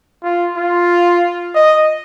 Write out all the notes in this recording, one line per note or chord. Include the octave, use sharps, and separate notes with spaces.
F4
F4
D#5